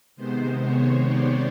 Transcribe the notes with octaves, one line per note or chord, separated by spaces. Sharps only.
C3 D#3 G#3 B3 C5
C#5
D5